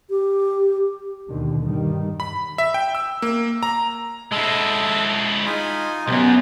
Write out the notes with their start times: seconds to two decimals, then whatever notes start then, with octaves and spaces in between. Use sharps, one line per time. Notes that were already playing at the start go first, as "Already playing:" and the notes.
0.10 G4
1.29 D#2 B2 D3 D#3
1.62 G2 D#3 G3
2.20 B5
2.58 E5
2.74 G5
2.95 E6
3.22 A#3
3.63 A#5
4.32 G#3 E4 A4
5.46 D#4 F4 G#5
6.08 C2 F#2 B3 G4